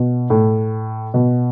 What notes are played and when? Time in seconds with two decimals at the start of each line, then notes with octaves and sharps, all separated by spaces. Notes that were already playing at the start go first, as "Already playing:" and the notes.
Already playing: B2
0.30 A2
1.14 B2